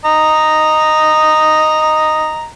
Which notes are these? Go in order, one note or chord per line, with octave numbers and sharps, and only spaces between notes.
D#5 A#5